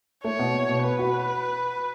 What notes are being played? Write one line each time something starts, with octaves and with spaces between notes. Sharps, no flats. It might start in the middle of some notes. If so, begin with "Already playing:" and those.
A3 C#5
B2
B2
B2
B3 B4
F#4